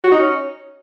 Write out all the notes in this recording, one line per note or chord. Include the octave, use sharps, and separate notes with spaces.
F#4
D#4
C#4